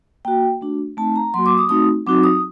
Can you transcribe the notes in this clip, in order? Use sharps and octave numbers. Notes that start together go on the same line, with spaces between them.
A#3 F#4 G5
A3 D4 F#4
A3 C4 D#4 A5
A#5
F#3 A#3 F#4 C6
D6
D#6
A3 C4 D#4 F#4 D#6
F#3 C4 D#4 F#4 D6
D#6